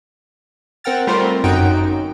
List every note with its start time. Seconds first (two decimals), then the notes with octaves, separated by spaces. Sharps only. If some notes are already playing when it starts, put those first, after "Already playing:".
0.84 C4 A#4 F#5 G5 F6 A6
1.07 G3 A3 C4 F4 A#4 C5
1.44 G1 F#2 D#4 F#4 G5 D7